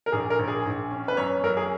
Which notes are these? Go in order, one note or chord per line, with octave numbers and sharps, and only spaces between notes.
A#4
A#1 G#4
A#4
A#1
G#4
A#1
C#4
B4
F#2 C#5
F#2 A#4
G#4